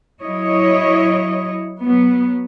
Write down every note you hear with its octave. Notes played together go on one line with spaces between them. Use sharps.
F#3 E4 C#5 D#5
F#3 B3